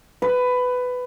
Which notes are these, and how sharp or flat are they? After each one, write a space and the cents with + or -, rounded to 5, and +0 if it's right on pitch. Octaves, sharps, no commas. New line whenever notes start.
B4 +15